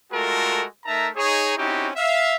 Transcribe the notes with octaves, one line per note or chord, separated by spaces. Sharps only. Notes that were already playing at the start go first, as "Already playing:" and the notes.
G#3 A3 F4 F#4 A4 A#4
A3 D#4 A#4 E5 A5 A#5
D#4 G#4 C#5
C4 C#4 D#4 E4 F#4 G4
E5 F5